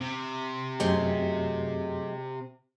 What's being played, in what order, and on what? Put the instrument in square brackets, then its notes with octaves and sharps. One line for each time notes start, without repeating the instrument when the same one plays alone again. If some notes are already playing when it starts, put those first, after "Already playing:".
[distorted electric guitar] C3
[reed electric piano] F#2 C4 G4 [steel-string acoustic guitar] F#3 G#3 A3